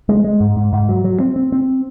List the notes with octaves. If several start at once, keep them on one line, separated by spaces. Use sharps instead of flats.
G#3
G#3
G#2
G#2
G#2
F#3
F#3
C4
C4
C4